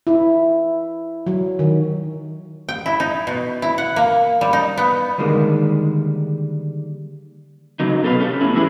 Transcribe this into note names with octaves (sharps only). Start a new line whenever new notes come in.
E4
F#3
D#3
G5
E4
D#4
B2
E4
F#5
A#3
G3
D#4
B3
D3 D#3 G3 G#3 A#3
C#3 F#3 D#4
B2 A4 B4 C5 F5
C#4 G4 A4
E2 A2 C#4 E4
F#3 G3 E4 G#4 B4